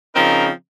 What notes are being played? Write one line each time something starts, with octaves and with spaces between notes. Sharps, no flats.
C#3 F3 C4 D#4 A#4